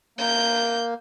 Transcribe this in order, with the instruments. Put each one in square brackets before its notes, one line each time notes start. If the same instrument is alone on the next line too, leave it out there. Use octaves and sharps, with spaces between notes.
[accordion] A#3 [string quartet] G6